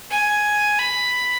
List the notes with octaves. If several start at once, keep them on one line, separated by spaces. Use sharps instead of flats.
G#5
B5